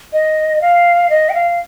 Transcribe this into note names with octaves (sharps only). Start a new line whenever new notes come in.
D#5
F5
D#5
G5
F5